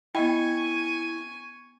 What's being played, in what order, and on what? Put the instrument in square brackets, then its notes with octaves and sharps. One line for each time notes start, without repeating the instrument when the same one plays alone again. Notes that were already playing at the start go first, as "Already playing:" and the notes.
[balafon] B3 D#5 B5 [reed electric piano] E4 [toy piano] G5 [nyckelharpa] G#5 C#6